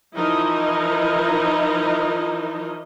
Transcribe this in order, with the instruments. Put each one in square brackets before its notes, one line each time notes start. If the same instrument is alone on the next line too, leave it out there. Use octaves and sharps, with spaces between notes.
[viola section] E3 F3 D#4 E4 A#4 D#5